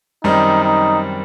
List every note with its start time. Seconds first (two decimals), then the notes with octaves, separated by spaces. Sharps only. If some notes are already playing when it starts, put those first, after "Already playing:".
0.24 F#2 D#3 G3 C4 D#4
0.64 D#4